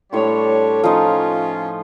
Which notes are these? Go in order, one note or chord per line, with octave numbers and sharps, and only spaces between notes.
A2 G3 D4 C#5 C6
F3 C#4 D#4 F4